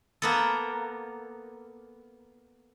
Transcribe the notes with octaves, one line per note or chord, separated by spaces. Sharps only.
A#3 B3 A4